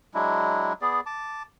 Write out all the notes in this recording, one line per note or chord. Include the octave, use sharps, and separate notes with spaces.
F#3 G#3 D4 E4
B3 G#4 D5
A5 D6